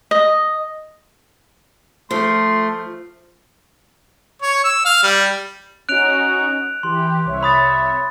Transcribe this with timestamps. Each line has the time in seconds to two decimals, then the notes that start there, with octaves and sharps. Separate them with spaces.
0.11 D#5
2.11 F3 A3 C6
4.42 C#5
4.64 E6
4.85 F5
5.03 G3
5.89 C#4 D#4 F#4 F#6 D7 F7
6.83 E3 G4 C6
7.25 C2 C#5 E5
7.43 B5 D#6 A6